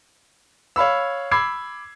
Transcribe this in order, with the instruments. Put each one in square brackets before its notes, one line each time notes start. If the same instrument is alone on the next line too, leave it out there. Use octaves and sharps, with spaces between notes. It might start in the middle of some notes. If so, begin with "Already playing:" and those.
[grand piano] C#5 F5 B5 E6
B5 D6 E6 G#6 C7